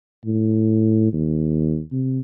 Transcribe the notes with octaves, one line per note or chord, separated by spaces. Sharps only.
A2
D#2
C3